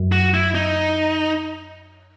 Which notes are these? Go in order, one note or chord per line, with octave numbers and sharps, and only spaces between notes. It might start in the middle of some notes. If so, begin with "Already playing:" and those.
Already playing: F#2
F#4
E4
D#4